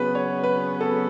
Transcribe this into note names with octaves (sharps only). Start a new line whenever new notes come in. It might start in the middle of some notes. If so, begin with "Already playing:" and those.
Already playing: C#3 F#3 B3 B4
C#5
B4
A4